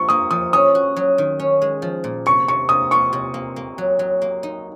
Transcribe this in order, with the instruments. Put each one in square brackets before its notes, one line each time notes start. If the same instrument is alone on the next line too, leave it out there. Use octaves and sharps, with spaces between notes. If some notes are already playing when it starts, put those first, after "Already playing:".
Already playing: [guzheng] F3 F4 [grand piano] C#6
[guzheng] A#3 [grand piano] D#6
[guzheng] F3 [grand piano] D#6
[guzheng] C#4 [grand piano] D#6
[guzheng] F#4
F#3
D#3
C#4
G#3
F3
A#2
[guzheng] C3 [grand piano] C#6
[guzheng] C3 [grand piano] C#6
[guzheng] C3 [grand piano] D#6
[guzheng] F4 [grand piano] C#6
[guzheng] C3
A#3
A#3
F#3
F#3
A#3
D#4